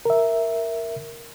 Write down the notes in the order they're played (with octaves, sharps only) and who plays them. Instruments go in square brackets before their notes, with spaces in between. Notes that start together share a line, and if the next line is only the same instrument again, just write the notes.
[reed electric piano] A#4 E5